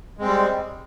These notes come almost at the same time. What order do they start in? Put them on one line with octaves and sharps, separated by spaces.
G#3 C4 G3